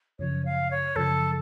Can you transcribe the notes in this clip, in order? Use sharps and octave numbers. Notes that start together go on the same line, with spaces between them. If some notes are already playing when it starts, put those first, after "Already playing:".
F#2 C#3 F3 C#5
F5
C#5
F#2 C#3 F3 A4